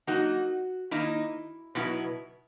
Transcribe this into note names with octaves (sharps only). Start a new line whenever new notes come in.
F#3 A#3 D#4 F#4
D#3 A#3 D#4 E4
B2 F#3 B3 E4